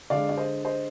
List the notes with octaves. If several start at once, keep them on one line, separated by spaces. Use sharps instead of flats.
D3 G#3 D5 F5
D5
C5 D#5
C5 D#5